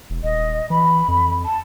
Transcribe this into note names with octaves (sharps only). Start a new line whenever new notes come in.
E1
D#1 D#5
E3 B5
F2
A5